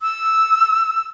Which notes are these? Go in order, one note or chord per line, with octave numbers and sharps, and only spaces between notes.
E6